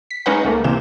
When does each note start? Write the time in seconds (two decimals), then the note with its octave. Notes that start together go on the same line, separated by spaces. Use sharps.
0.11 B6
0.26 G#3 C#4 D#4 B4 F5 F#5
0.45 C#2 A3 A#3
0.64 C3 E3 A#3 G6 E7